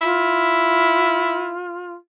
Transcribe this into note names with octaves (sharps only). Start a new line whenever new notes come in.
E4 F4